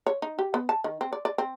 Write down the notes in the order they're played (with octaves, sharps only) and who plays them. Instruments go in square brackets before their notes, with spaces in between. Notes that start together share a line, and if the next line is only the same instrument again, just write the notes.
[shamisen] C#5
D#4
G4
B3
A5
D#3
C4
D5
D5
C4